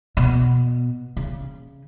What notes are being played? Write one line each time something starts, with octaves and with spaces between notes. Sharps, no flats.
B2
C#3